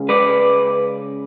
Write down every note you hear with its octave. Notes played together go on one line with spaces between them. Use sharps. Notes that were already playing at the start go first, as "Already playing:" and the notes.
Already playing: C#3 G#3 C#4
B4 D5